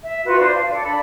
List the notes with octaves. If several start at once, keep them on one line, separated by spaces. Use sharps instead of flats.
E5
F4 F#4 B4
D4 C5
F5
A4 D5
D4 B5